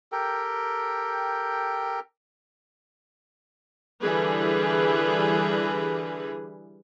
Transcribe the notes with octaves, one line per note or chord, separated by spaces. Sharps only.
G4 A4 A#4 G5
D3 E3 G3 G#4 B4